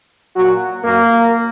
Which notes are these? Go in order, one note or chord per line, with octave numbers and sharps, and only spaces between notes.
A#2 F#3 F#4
F#2 F#3 A#3